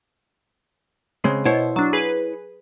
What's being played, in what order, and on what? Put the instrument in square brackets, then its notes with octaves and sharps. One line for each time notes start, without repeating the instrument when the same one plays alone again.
[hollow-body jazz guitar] C#3 G#3 C4
[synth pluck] B2 [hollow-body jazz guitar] E4 C5 C#5
[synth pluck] F#3 D4
G#4 B4